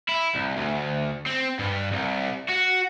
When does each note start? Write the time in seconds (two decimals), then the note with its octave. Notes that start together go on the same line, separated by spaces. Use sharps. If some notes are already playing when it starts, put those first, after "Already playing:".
0.09 E4
0.35 C2
0.57 D2
1.26 C4
1.59 G2
1.93 C2
2.49 F#4